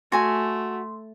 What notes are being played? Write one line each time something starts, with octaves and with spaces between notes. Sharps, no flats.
A3 F#4 G#5 C6